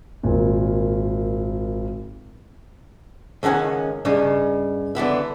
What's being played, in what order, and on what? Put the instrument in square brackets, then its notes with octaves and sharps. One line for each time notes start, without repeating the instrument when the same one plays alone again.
[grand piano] G#1 A#2
[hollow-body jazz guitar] C#2 D#3 C#4 F#5 G#5
G2 C#3 D#4
D3 E3 B3 E4